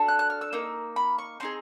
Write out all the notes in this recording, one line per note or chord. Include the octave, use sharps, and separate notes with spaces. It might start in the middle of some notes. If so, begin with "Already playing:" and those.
Already playing: D4 F#4 A4
F#6
F#6
F6
E6
A#3 D#4 E6
B5
C#6
C4 D#4 G#4 C6